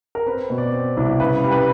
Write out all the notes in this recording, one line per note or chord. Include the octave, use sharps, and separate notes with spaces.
A#4
C4 B4
B2
D5
C4
C2
C#3 B4
G3
B4